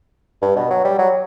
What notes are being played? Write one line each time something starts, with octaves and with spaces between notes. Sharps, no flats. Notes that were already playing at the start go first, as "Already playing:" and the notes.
G2
B2
F#3
G3
F#3